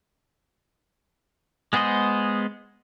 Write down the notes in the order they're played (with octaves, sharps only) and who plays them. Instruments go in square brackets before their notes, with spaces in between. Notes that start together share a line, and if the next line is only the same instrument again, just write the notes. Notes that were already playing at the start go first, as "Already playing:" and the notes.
[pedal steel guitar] G#3 B3 G#4 C5 D#5